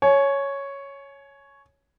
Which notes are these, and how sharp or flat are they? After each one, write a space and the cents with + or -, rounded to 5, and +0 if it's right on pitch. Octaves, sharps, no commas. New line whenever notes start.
C#5 +0 G#5 +35